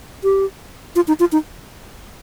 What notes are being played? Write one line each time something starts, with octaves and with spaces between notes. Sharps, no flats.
G4
F4
D#4
F4
D#4